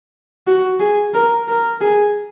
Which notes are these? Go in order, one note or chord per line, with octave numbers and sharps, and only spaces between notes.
F#4
G#4
A#4
A#4
G#4